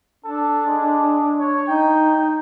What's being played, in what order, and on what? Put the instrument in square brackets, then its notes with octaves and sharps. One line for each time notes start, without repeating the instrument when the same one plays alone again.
[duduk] D4 [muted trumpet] A4
[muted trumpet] G#3
C#5
[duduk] D#4 [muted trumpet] G5